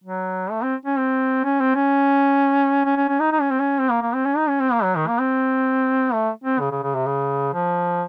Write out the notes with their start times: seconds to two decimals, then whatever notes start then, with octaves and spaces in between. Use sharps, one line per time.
0.04 F#3
0.51 A3
0.63 C4
0.86 C#4
0.98 C4
1.44 C#4
1.60 C4
1.75 C#4
2.85 C#4
2.97 C#4
3.08 C#4
3.20 D#4
3.32 D#4
3.41 C#4
3.51 C4
3.59 C#4
3.79 C4
3.90 A#3
4.02 A#3
4.14 C4
4.25 C#4
4.37 D#4
4.48 C#4
4.61 C4
4.72 A#3
4.84 F#3
4.96 D#3
5.08 A#3
5.19 C4
6.13 A3
6.44 C4
6.60 C#3
6.72 C#3
6.83 C#3
6.95 C3
7.07 C#3
7.53 F3